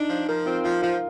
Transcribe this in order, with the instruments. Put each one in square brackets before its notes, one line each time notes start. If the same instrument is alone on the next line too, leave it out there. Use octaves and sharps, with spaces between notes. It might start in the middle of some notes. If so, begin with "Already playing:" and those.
Already playing: [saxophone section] D4 [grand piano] D#4
[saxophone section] F3
[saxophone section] F3 [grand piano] A#4
[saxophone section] C4 [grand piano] F4
[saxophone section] F3 [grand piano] F4
[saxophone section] F3 [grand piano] F4